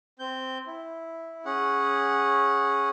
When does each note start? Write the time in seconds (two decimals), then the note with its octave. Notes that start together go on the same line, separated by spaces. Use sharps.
0.19 C4 G6
0.67 E4
1.45 C#4 G#4 F#5